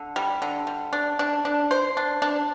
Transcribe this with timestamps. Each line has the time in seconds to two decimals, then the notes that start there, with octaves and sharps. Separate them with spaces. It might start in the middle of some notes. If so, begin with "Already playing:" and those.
Already playing: D3
0.16 G3
0.42 D3
0.67 G3
0.93 D4
1.19 D4
1.45 D4
1.71 C5
1.97 D4
2.22 D4